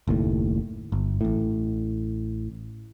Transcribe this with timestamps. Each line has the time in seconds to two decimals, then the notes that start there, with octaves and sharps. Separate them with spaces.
0.07 F#1 D#2 A2
0.92 G1
1.21 A1 A2